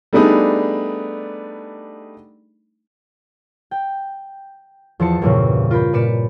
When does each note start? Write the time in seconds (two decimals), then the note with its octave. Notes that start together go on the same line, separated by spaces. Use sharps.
0.13 G3 A3 B3 D4 D#4 G#4
3.71 G5
5.00 E2 F3 C5 A5 C#7
5.22 E2 G2 A#2 C#3 C4 C#4
5.71 F4 A#4 B5 G6
5.93 A#2 B4 D5 B6 C#7 E7